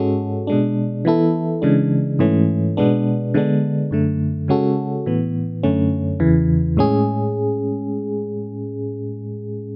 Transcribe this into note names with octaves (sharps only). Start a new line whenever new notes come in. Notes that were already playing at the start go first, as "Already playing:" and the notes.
Already playing: G#2 G#3 C#4 F#4 A4
B2 G#3 D4
E3 B3 E4 A4
C#3 E3 G#3 D4
G#2 E3 A3 C#4
B2 G#3 B3 D4
D3 G#3 B3 D4
F#2 D3 A3
C#3 G#3 C#4 F#4 A4
A2 E3 B3
F#2 D3 A3 C#4
E2 C#3 E3
A2 G#3 C#4 G#4